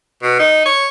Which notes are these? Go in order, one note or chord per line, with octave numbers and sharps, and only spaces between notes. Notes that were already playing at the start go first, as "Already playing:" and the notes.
B2
D#4
C#5